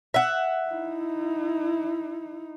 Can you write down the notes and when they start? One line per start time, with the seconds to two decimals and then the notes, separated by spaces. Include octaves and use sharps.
0.14 E5 F#5
0.69 D#4 E4